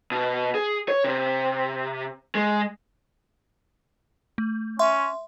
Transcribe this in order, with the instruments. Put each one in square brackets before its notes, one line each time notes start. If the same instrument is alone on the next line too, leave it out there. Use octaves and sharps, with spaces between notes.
[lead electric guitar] B2
G#4
C#5
C3
G#3
[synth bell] A3
[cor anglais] C#4 [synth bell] E5 C6